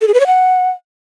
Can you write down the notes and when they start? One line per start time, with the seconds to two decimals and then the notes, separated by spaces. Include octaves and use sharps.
0.01 A4
0.08 G#4
0.14 B4
0.20 C#5
0.27 F#5